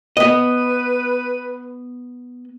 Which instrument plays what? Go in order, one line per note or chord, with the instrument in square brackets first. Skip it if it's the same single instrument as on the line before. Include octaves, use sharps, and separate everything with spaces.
[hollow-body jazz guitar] B3 D#5 [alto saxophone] B4